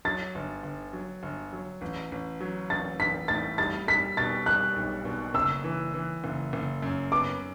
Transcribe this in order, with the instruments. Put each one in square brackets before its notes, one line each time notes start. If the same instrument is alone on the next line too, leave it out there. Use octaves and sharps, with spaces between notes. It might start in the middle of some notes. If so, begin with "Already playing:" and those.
[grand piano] F#3 [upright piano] A6
[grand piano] G1
G1
F#3
G1
F#3
A1
A1
F#3
[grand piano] A1 [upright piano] A6
[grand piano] A1 [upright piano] B6
[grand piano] A2 [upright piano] A6
[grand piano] G3 [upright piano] A6
[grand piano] G3 [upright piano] B6
[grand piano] B2 [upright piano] A6
[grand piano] G3 [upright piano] F#6
[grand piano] B1
B2
[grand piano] F#1 [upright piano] E6
[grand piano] E3
E3
F#1
F#1
F#2
[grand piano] B3 [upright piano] D6